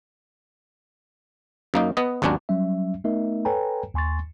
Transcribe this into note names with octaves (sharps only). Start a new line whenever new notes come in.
F#2 A#3 D#4
B3 D#5
G#1 D#2 F#3 C#4 D4
F#3 G3 C#4 E5
A3 B3 D#4 A#4 D#5 E5
A4 B4 C#5 G5 G#5 A#5
D#2 G#5 C6 C#6 A6